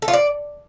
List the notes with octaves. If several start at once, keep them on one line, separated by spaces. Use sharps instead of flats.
A4
F4
D5